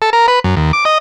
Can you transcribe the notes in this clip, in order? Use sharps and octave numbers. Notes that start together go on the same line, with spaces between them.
A4
A#4
B4
F#2
D#2
D6
D#5